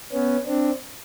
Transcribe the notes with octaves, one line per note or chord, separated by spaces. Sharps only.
B3 C#4
C4 D4